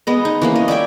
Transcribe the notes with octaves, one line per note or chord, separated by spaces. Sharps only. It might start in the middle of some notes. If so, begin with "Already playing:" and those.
G#3 B3 D#5
D#4
E3 A#3 C#4
D#5
D5 E5 G5 G#5